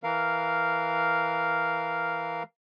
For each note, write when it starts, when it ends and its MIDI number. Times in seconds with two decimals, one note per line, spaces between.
0.03 2.43 52
0.03 2.43 70
0.03 2.43 77